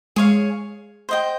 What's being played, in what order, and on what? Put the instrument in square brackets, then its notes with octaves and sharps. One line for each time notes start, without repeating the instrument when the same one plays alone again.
[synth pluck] G#3 [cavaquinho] G#4 C#5 F5
[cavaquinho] C5 D#5 G5